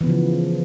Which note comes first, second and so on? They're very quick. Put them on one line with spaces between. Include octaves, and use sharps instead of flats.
E3 B3 C#3 F3